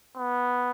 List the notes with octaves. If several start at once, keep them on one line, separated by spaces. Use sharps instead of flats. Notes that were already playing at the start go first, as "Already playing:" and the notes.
B3